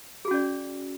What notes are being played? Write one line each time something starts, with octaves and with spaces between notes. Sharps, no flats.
C#4 F#4 G#4 D5